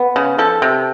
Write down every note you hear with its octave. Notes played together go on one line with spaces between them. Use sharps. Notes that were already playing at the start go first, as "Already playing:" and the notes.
Already playing: B3
C#3
F3 A4
C3